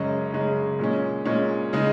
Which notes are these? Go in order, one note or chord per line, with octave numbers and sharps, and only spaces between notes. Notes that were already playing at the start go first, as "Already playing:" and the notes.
Already playing: F#2 C#3 G#3 C#4
F#2 C#3 G#3 C#4
A#2 G#3 C#4
A#2 G#3 C#4
C#3 G#3 D#4